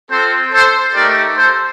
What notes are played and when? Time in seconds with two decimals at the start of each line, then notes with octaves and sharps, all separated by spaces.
0.10 C4 F4 A4 C5
0.52 A4 C5
0.95 A3 D#4 G4 A#4 D5
1.37 A4 C5